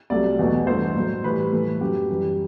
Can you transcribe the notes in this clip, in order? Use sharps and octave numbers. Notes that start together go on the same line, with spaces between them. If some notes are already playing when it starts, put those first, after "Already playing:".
C2 C3 F#3 A3 D5
E2 B2 F#3 A3
G2 E3 A3 C5
A2 F#3 A3
A2 E3 G3 B4
A2 E3 A3
F#2 F#3 A3 G4
F#2 E3 G3